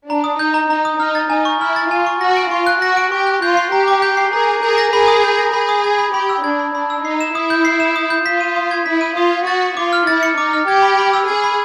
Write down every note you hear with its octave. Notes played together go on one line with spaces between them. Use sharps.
D4 A#5
D#6
D#4 G6
A#5
D#4 A#5
D#6
D#4 F6
A6
D#4 G#5
C#6
E4 F6
A6
F4 G#5
C#6
F#4 A#6
D7
F4 C#6
F#6
F#4 A#6
D7
G4 C#6
F#6
F4 G6
C7
G4 A#5
D6
G6
C7
G#4 A#4 A#5
D6
G#4 A#4 G6
A#6
G#4 A#4 B5
D#6
G6
A#6
G#4 B5
D#6
G#6
B5
G4 B5
E6
D4 G#6
B5
D4 B5
E6
D#4 C7
E7
E4 D#6
G6
C7
E7
D#6
G6
F4 B6
D#7
D#6
G#6
E4 B6
D#7
F4 D#6
G#6
F#4 A6
C#7
F4 D6
F6
E4 A6
C#7
D#4 D6
F6
G4 G#6
B5
B5
E6
G#4 G#6
B5